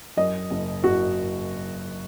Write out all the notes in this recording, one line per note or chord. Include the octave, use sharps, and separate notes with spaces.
F#2 D#5
F#1
F#1 F#4